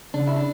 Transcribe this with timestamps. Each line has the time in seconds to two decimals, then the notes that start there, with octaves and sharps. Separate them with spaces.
0.14 C#3 D4
0.27 E4
0.36 D4